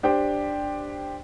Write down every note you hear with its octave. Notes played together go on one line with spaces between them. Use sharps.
D4 G4 C5 G5